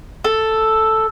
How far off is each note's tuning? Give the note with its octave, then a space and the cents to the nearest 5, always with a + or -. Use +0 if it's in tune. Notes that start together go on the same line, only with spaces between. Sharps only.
A4 +0